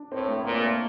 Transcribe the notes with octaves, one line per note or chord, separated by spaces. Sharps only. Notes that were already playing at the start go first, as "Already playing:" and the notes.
Already playing: D4
A2 C4
A3
A#2 A#3
A3